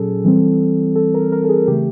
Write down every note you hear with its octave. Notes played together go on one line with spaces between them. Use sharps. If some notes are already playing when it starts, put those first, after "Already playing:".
Already playing: A#2 F#3 C#4 G#4 A4
E3 G3 C4
A4
A#4
A#4
A4
G#4
C#3 E3 A3 G4